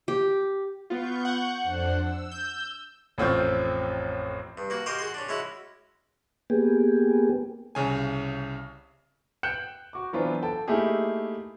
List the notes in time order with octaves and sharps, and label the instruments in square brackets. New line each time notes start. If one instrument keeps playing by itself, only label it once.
[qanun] G4
[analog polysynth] B3 F4 [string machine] C#6 G6
[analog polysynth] F#5
[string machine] F2 D4 C5
E6
[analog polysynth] G6
[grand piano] A1 F2 C4 F4 C#5 G6
[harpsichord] G2
A#3 F#4
F#4 G4 A#4 D#5 G#5 C6
F#4 G#4 C6
C#4 D4
G#3 C#4 E4 F#4
[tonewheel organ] A#3 B3 G4 G#4
[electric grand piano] C2 C#3 G#5
[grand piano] G5 F#6 G6 C#7 E7 F#7
F#4 D6
E3 F#3 B3 C4 D4 F4
A4 G5 A5
A3 A#3 D#4 E4 G4 G#4